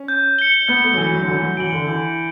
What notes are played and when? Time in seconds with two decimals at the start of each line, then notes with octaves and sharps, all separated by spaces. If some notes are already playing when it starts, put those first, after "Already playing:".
Already playing: C#4
0.08 G6
0.39 C#7 G7
0.68 B3 G6
0.84 A3
0.94 F#3
0.97 E3 C#7 G7
1.13 F#3
1.21 D3
1.28 E3 G6
1.43 F#3
1.57 E3 D7 F#7
1.72 D3
1.87 E3 G6